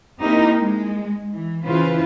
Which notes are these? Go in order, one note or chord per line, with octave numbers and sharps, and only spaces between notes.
A#3 C4 D#4 E4 G4 A#4
G#3
E3
C#3 E3 E4 F4 B4 C5